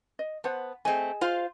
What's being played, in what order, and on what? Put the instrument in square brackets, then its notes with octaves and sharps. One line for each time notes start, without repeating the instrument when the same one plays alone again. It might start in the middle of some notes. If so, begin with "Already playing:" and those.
[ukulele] D#5
[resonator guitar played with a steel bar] B3 [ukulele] C5 F#5 A5
[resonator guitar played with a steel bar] A3 C4 [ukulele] G#4 D#5 G#5
[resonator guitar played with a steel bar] F4 C5 F5